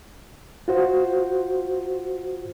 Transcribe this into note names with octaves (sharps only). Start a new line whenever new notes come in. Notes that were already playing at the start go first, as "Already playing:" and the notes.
F4 F#4 C5